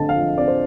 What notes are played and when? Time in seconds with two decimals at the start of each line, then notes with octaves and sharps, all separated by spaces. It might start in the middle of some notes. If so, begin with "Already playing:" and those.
Already playing: D3 A3 C4 A5
0.09 F5
0.16 F3
0.37 C4 D5
0.48 C5